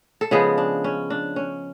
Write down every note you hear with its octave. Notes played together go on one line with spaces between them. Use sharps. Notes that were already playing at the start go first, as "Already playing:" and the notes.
A4
C#3 F3 G#3 B3 G#4
D4
C#4
D4
C#4